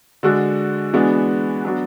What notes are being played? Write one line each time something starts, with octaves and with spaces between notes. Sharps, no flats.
D3 G#3 D4 F#4
E3 G#3 B3 D4 F#4
F#3 B3 D4 F#4